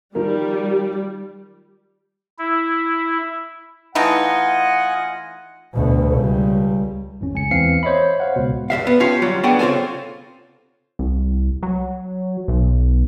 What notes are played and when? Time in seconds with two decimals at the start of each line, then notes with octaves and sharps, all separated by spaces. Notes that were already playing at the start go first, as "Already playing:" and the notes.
0.15 D#3 F3 G3 A#4
2.39 E4
3.95 E3 A3 D#4 F4 D#5 F#5 G#5
5.74 D2 B2
6.13 C#2 G3
7.21 G#1 F2 C#4
7.34 C#2 G#5 C#7
7.51 E2 E3 C4 F5 C7 C#7
7.83 C5 C#5 D#5 E5 B5
8.20 C5 F5 F#5
8.36 C#2 B2
8.70 G2 C#3 E5 F5
8.87 B3
9.00 C#4 F4 G4 F5 A5
9.22 D2 F#3 G3 F4
9.43 A3 B3 D4 G#4 F#5 G5
9.59 C#3 C4 F4 A4 G#5
10.99 C2
11.63 F#3
12.48 B1